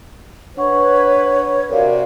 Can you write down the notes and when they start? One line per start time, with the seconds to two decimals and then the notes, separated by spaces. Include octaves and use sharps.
0.57 D4 B4 C#5 F#5 C#6
1.69 C3 F#4 A#4 D5 F5